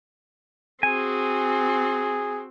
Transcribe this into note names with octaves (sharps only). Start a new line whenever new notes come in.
C4 F#4 G#4 G#5